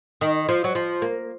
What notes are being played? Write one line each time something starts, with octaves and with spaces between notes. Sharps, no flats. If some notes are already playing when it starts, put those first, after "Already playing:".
D#3
F3
F#3
F3
A#3